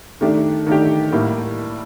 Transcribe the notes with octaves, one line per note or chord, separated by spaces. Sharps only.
D#3 A3 D4 G4
D#3 A3 D4 G4
A2 G3 A#3